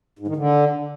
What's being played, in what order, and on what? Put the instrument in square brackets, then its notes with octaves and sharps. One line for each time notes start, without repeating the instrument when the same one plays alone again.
[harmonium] G#2
D#3
D3